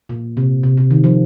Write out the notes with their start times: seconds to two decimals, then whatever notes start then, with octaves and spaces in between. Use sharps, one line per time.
0.09 A#2
0.37 C3
0.63 C3
0.77 C3
0.91 D#3
1.04 F3